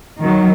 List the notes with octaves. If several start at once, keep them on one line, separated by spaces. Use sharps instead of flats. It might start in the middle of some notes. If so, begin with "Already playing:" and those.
D#3 F#3